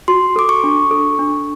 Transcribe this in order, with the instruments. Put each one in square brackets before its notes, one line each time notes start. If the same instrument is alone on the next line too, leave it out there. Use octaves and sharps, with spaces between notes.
[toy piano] F#4 [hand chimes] C6
[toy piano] A4 [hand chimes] D6
[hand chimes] C#6
[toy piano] D4
A4
D4